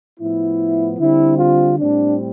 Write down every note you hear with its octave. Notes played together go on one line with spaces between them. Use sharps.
A2 F3 B3 E4
D3 G3 C4 E4
F4
A2 G3 C4 D4